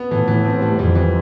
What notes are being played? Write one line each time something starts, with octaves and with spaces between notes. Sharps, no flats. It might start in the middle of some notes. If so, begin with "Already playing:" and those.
Already playing: B3
A2 E3
E3
C4
G3
F2 E3
E3